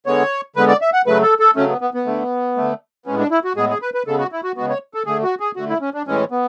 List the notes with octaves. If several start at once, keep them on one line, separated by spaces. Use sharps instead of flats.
D3 G#3 B3 C#5
D3 G#3 B3 B4
D5
E5
F#5
C#3 F#3 A3 B4
A4
A4
C#3 F#3 A3 C#4
B3
B3
B3
D3 A3
D3 A3
A2 G#3 B3 C#4
D4
E4
F#4
A2 G#3 B3 G#4
G#4
B4
B4
C#3 G#3 B3 A4
F#4
E4
F#4
C#3 G#3 B3 F#4
C#5
A4
D3 A3 G#4
F#4
G#4
D3 A3 F#4
E4
C#4
D4
A2 E3 G#3 C#4
B3